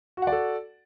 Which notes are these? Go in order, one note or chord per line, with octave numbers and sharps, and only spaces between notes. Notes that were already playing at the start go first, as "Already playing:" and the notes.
F#4 A4 D5 F#5